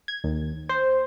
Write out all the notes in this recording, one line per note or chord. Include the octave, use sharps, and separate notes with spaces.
G#6
D#2
C5